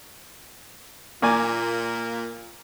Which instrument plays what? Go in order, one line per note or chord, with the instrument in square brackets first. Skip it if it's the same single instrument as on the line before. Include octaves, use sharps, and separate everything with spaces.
[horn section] A#2 [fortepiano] A#3 D5 G#5